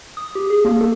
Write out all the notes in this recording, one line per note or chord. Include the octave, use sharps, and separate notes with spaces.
D#6
G4
G#4
A#3
A4